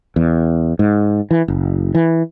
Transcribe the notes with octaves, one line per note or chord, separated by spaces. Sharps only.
E2
G#2
E3
F#1
E3